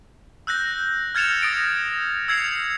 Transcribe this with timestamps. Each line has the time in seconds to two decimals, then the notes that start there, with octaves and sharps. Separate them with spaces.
0.47 E6 F#6 G6 A#6
1.15 F6 G#6 A6 C#7 E7 F7
1.42 D#6 A6 A#6 D7
2.28 E6 G#6 C7 C#7 F7